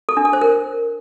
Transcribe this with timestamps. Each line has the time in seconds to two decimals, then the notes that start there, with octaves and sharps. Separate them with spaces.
0.09 A4
0.17 D4
0.25 A4
0.33 C5
0.41 A#4